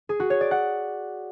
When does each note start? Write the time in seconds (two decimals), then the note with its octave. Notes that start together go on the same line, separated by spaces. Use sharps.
0.09 G#4
0.20 F#4
0.30 C#5
0.41 D5
0.51 F#5